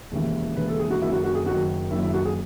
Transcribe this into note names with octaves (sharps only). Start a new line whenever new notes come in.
E1 D#2 C#3 E3
E1 D#2 C#3 E3 B4
A4
G#4
F#4
F#1 F#2 D#3 F#3 E4
F#4
F#4
G#4
F#1 F#2 D#3 F#3 F#4
F#1 F#2 D#3 F#3 E4
E4
F#4
G#4